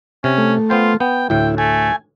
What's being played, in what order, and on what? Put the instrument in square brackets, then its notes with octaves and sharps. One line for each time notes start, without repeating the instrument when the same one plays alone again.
[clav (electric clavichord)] C3 [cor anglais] C#4
[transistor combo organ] A3
[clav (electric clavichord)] B3 C5 G5 [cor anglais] F4
[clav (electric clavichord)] B3 [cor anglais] G5
[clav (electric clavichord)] D2 A2 [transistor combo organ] E4 [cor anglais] G5
[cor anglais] A3 [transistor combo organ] G#5